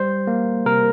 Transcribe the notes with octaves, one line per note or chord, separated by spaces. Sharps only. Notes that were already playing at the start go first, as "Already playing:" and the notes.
Already playing: G3 C5
A#3
C3 A#4